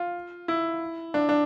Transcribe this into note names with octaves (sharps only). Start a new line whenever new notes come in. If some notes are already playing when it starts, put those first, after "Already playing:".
Already playing: F4
E4
D4
D4